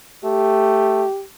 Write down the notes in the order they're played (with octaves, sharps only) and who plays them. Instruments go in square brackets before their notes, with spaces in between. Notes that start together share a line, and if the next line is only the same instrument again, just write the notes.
[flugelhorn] A3 [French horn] G4